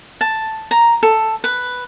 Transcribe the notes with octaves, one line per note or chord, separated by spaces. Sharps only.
A5
A#5
A4
B4